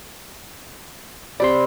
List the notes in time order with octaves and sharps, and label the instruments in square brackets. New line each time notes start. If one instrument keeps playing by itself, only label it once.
[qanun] C3 B5 [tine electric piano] D5 C6